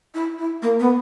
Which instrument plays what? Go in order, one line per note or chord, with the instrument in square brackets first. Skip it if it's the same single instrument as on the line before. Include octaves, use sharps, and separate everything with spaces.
[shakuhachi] E4
E4
A#3
B3